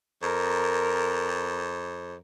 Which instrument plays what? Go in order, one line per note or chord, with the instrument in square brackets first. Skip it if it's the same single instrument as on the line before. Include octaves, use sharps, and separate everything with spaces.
[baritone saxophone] F2 [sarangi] A#4